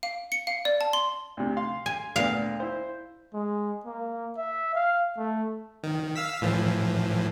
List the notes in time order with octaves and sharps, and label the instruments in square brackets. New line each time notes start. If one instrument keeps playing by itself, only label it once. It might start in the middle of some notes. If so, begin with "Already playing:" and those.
[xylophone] F5
C#7
F5
D5
A5
C6
[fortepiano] D2 C3
F5 C6
[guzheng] G#5
[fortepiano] D2 A#2 B3 [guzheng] F5
[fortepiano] E4 C5
[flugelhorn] G#3
A#3
E5
F5
A3
[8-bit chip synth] D#3
F5 E6 B6
A2 E3 F3